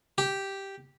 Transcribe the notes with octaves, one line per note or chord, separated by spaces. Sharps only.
G4